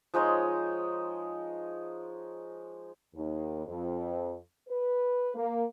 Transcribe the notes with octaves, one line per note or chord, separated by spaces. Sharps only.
F3 G#3 D#4 C#5
D#2
F2
B4
A#3